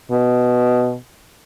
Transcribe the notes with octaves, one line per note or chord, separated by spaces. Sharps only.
B2